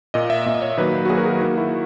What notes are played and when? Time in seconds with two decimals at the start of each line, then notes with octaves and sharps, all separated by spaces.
0.14 A#2 A#3 D#5
0.30 E5
0.46 A#2 A#3 E5
0.54 D#5
0.62 C#5
0.77 D#3 F#3 A#3 B4
1.05 F#4
1.10 D#3 F#3 A#3 G#4
1.18 A#4
1.26 G#4
1.42 D#3 A#3 F#4
1.58 E4